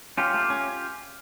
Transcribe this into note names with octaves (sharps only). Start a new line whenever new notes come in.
C#4 F4 G4
A3
C#4